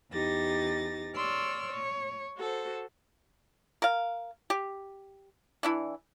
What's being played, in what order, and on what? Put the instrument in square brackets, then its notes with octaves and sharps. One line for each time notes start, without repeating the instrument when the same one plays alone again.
[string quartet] E2 D#4 G4 A6 A#6
C#5 D5 C6 E6 F6
C#5
F#4 A4 C5
[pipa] A#4 F5
G4
E3 D4 E4